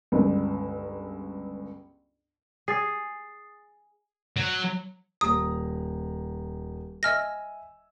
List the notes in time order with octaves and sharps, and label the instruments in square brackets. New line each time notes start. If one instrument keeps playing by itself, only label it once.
[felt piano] G1 C#2
[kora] G#4 [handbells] D#6 A6 C7
[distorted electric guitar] F#3
[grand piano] D#1 A#5 [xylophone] D#6
[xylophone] D#5 F6 A#6 [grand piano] E5 G#5 E6